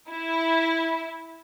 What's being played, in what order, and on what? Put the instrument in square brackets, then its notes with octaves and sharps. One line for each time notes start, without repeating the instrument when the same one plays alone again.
[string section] E4